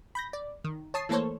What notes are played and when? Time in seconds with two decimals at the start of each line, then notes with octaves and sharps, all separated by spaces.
0.15 B5 G6 A#6
0.33 D5
0.64 D#3
0.94 C#5 A5 D#6 C7
1.09 E3 A3 A#3 A4 C5 C#5